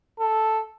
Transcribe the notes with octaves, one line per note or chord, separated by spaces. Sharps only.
A4